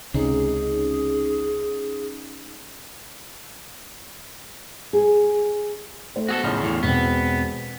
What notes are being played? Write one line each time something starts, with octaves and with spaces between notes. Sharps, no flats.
C#2 C3 C#4 D#4 G#4
G#4
A3 C5
B3 F#4 G#4 A4
A2 C#3 F3 C6 F6
E2 A2
E1 B3 C4